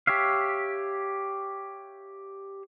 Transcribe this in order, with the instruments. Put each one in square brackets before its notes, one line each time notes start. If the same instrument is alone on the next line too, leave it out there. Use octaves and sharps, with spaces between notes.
[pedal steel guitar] G4 C#5 E5 F5